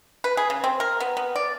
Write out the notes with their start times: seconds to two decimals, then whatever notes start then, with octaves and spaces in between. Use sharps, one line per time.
0.24 B4
0.37 G#4
0.50 C#3
0.64 C4
0.80 A#4
1.00 B3
1.17 B3
1.36 D5